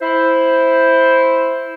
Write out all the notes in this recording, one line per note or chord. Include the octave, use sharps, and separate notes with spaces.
E4 C5